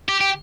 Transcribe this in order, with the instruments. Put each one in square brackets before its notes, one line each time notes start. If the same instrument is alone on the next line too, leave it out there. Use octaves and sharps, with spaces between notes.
[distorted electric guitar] G4
G4